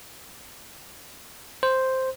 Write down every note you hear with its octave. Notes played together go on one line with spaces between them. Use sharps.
C5